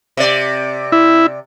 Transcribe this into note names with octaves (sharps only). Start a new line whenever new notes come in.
C3 D5
E4